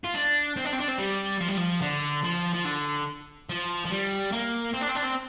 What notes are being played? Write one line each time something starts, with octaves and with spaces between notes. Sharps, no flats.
F4
D4
C4
D4
C4
D4
C4
G3
F3
G3
F3
D3
F3
F3
D3
F3
F3
G3
A#3
C4
D4
C4
D4
C4